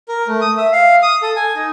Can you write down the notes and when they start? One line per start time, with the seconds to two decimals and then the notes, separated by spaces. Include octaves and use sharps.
0.08 A#4
0.28 A3
0.41 D#6
0.57 E5
0.72 F5
1.03 D#6
1.22 A4
1.36 G#5
1.55 D#4